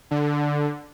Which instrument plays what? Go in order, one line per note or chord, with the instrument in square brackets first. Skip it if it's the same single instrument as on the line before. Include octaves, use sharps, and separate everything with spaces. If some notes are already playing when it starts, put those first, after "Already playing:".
[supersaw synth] D3